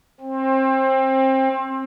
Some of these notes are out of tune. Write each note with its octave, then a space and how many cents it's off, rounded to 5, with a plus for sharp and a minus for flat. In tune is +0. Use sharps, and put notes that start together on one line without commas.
C4 +25